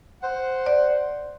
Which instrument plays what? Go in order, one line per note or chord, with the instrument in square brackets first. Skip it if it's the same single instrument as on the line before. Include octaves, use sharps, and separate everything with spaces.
[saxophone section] C5 F#5
[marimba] D5